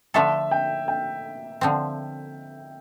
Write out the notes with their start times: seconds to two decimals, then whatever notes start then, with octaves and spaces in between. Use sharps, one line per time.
0.14 D3 F3 A3 D4 A4 E5
0.51 G5
0.88 G5
1.61 D3 F3 C4